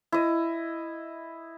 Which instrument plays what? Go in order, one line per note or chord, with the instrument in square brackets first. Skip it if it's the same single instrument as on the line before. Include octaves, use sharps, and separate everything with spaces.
[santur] E4 D#5